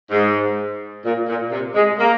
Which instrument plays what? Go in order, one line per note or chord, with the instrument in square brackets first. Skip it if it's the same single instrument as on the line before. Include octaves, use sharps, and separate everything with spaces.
[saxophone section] G#2
A#2
A#2
C3
G#3
A#3